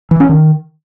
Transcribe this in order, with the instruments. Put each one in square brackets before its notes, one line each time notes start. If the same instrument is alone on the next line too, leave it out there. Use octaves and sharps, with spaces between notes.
[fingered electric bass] E3
C#4
D#3